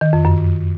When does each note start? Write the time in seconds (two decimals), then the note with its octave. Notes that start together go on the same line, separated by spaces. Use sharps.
0.01 D#3
0.13 F2
0.25 F#2